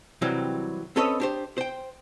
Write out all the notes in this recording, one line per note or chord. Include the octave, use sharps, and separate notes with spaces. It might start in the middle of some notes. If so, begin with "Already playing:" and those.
C3 E3 F#3 G3 C4
C4 C#4 A4 B4 C#5 D#5
D4 G4 C5
C5 G5